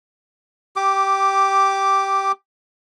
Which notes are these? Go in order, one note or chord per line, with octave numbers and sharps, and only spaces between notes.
G4 D6